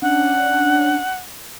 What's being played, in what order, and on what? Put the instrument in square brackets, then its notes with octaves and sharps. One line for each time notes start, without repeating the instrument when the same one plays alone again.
[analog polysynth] C#4 D4 [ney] F#5